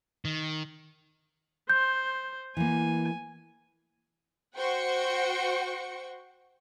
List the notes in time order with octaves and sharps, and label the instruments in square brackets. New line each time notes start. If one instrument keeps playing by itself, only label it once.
[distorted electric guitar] D#3
[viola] C5 [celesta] G6
[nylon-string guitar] E3 A#3 [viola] G#5
[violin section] F#4 C5 F#5 G5 C#6 C#7